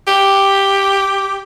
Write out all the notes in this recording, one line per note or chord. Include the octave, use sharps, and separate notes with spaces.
G4